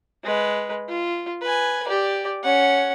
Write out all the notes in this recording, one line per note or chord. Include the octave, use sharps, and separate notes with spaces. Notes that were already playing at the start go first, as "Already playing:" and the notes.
G#3 B4
F4
B4 G#5
G4 D5
C#4 F#5